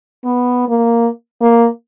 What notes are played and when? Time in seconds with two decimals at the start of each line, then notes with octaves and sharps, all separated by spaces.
0.25 B3
0.68 A#3
1.41 A#3